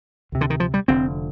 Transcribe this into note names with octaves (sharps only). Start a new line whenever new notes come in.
D2 C3
D3
D#3
F3
G3
F1 F2 D3 C4